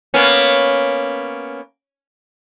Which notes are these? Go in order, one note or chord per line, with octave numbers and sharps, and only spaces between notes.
A#3 B3 C#4